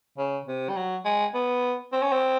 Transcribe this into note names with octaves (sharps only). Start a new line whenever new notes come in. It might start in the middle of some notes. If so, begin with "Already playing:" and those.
C#3
C3
G3
F#3
G#3
B3
C4
C#4
C4